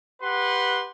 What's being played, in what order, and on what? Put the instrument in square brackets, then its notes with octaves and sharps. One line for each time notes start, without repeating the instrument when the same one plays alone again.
[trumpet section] G4 B4 F#5 C6